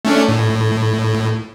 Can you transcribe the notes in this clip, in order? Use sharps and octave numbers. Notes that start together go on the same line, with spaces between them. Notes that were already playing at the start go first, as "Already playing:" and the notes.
A3 C#4 D4
A2